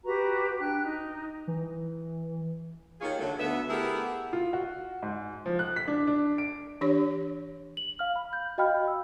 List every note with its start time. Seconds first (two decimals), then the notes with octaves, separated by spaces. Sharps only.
0.05 F#4 G4 B4 A#5
0.59 D4 G5 F#6
0.82 D#4
1.47 E3
3.01 D#2 D#3 F4 G#4 C#5
3.19 D3 F#3 A3
3.39 D2 B3 E5
3.69 A3 B3 E4 G4 G#4 A#4
4.33 F4
4.53 F#4
5.03 G#2
5.46 F3
5.59 F#6
5.76 B6
5.88 D4
6.07 D4
6.38 D7
6.81 E3 D4 G4 C#5
7.77 F#7
7.99 F5 F6
8.16 B5
8.33 G6
8.58 F#4 D#5 F5 G5 B5 F6
8.88 E6